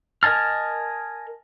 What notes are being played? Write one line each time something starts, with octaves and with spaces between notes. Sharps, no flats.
A#4 D#5 G#5 A5 F6